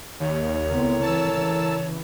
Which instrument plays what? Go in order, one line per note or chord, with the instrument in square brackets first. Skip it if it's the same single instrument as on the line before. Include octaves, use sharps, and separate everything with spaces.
[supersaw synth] D#2 [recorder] C#5
[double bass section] C#2 B3 C4 [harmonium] A2 A#4
[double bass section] E3 [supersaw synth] A5 E6
[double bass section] C#3 E3